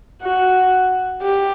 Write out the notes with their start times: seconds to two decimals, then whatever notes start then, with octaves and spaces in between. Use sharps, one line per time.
0.22 F#4
1.22 G4